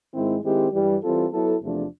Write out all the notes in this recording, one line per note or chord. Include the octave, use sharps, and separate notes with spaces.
G#2 D#3 G#3 C4 E4
D#3 G#3 C4 E4 G4
G2 E3 G3
E3 G3 C4 F4 A4
F#3 B3 E4 A4
E2 C3 F3 A3 D4